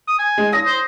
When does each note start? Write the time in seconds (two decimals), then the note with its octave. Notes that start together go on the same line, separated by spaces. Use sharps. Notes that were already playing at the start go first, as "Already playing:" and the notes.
0.08 D#6
0.19 G#5
0.38 G#3
0.52 D#6 A#6
0.66 C5